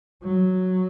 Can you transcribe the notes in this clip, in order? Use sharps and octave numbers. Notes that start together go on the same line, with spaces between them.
F#3